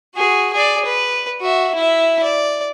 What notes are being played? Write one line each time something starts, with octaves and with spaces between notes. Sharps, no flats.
F#4 G#4
G#4 D5
B4
F#4 E5
E4 E5
D5